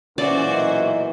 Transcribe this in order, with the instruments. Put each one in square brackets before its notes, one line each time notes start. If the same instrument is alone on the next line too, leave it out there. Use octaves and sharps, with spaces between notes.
[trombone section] B1 A#2 E3 [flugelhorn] C#4 [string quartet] F#4 C5 [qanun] D5
[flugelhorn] D#5